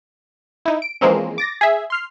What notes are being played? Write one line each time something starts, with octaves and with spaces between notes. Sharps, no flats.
D#4 E4
D7
E3 F3 G#3 A#3 C4 C#4
D6 A6 A#6
G#4 E5
C6 F6 C7